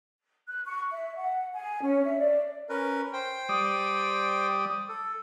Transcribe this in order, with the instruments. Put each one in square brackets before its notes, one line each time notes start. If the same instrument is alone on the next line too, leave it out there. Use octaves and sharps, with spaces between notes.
[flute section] F#6
C#6
E5
F#5
G#5
C#4
E5
D5
[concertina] C#4 A#4 B4
C5 G5
[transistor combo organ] G3 D5 D#6
[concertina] A4